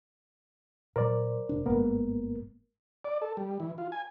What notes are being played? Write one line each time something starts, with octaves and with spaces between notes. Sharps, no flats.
A#2 F#3 A#4 C5 D5
F1 C3 D4
G1 G#2 A#3 B3 A#4
D5
A4
G3
E3
F4
G#5